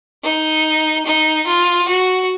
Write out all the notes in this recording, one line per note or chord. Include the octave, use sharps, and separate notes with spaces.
D#4
D#4
F4
F#4